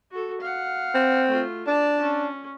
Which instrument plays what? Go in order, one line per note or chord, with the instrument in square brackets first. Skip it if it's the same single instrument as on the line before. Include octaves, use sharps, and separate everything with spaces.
[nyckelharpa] F#4 A4
F5 F#5
[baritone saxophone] C4
[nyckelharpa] A3 F4
[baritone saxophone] D4 [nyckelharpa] D5 A5
[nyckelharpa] C#4